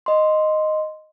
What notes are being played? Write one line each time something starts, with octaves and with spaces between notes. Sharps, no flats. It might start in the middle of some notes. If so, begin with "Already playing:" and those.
D#5 C6